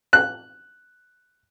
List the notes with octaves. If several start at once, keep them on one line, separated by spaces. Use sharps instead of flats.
F#6